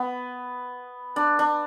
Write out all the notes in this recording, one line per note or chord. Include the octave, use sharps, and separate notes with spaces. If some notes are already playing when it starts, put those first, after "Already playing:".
Already playing: B3
D4
D4